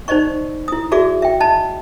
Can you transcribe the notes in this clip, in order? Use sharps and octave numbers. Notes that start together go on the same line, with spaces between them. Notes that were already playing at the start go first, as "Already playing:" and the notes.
D#4 C5 D5 D#5 C#6
E4 D#6
F#4 G#4 D5 E5 D6
E5 G5
D#5 A5 B5